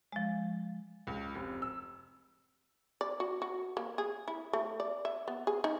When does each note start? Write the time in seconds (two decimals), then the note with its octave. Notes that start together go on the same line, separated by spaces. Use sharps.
0.12 F3 G#3
1.07 C#2
1.35 F1
1.62 E6
3.01 D5
3.20 F#4
3.42 F#4
3.77 A#3
3.98 G#4
4.28 E4
4.53 A3
4.80 D5
5.05 E5
5.28 B3
5.47 G#4
5.64 D#4